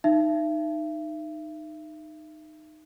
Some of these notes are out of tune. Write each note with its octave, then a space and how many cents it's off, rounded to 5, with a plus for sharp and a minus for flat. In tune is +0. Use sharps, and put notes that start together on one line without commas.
D#4 -15 E5 +35